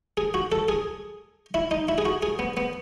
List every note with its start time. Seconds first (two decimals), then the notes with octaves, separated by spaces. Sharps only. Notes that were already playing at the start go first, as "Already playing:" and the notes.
0.17 G#4
0.34 F#4
0.52 A4
0.69 G#4
1.54 E4
1.71 D#4
1.89 E4
1.98 G#4
2.05 F#4
2.23 G#4
2.39 B3
2.57 B3